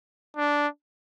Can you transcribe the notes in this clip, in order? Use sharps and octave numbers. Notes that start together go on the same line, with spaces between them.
D4